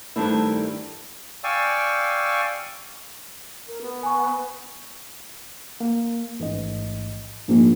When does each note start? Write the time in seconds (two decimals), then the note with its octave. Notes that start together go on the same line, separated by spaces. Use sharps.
0.16 G2 D#3 A3 C4 D4 E4
1.44 D5 F5 G5 G#5 C#6 E6
3.68 A#4
3.82 B3
4.03 G#5 C#6
5.80 A#3
6.40 A1 G#2 D#5
7.49 A#1 G#2